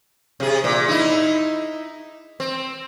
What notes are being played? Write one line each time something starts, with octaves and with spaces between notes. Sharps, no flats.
C3 G#4
A#2
D#4 E4
C4